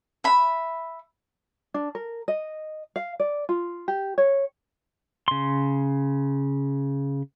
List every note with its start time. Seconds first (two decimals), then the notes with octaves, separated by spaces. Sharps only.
0.24 E5 B5
1.74 D4
1.95 A#4
2.28 D#5
2.96 F5
3.20 D5
3.49 F4
3.88 G4
4.18 C#5
5.28 C#3 C6